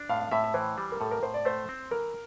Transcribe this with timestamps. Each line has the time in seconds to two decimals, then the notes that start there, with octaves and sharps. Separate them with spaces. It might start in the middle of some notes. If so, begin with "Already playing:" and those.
Already playing: D4
0.09 A2 F5
0.20 F5
0.31 A2 E5
0.44 E5
0.54 E3 C5
0.78 G3
0.92 A#4
1.00 A2 A4
1.11 A#4
1.23 A2 C5
1.34 D5
1.45 A3 C5
1.69 C4
1.91 E3 A#4